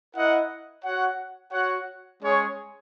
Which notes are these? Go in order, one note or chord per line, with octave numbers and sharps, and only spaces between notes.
E4 A#4 D#5 F#5
F#4 C#5 F#5
F#4 C#5 F#5
G#3 C#4 G#4 C#5